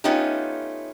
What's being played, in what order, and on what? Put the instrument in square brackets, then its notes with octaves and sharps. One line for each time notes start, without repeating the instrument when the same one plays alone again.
[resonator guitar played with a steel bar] A3 B3 C#4 D#4 F4 G4